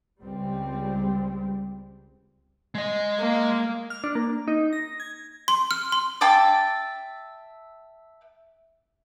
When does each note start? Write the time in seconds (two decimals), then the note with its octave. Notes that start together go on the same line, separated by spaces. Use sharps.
0.20 C#2 G3 C4
2.75 G#3 D#5
3.20 A#3
3.90 F6
4.04 D4
4.15 A#3
4.48 D#4
4.73 A#6
5.00 G#6
5.48 C6
5.71 F6
5.92 C6
6.21 E5 G5 A5 D6